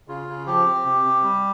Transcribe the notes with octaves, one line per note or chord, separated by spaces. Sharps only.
C#3 F4
C#3
F3 G4
C4
C3
C3
G3